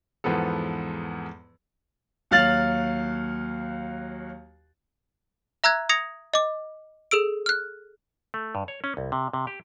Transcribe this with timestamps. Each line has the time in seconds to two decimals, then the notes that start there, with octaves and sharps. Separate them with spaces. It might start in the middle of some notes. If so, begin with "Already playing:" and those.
0.24 E2 G#2 F3 B3 A4
2.31 D#2 F#3 F5 F6 A6 F#7
5.64 E5 A#5 E6 F#6 G#6
5.89 D#6 G#6 A#6 C#7 F7
6.34 D#5 D6
7.11 G#4 A4 E6 D7
7.46 F6 F#6
8.34 A3
8.55 G2
8.68 C#5
8.84 C#4
8.97 C2
9.12 C3
9.33 C3
9.47 G4